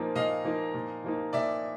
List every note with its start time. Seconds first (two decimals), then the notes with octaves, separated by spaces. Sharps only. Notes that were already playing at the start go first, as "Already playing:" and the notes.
Already playing: A#2 F3 A#3 D#4
0.15 A#2 D#5 F5
0.45 F3 A#3 D#4
0.74 A#2
1.04 F3 A#3 D#4
1.33 A#2 D5 E5